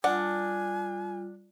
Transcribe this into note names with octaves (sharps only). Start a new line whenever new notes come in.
G3 D4 F4 F#5 G#5